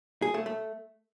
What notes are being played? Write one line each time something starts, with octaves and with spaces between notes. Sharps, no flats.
G#4
A3
A3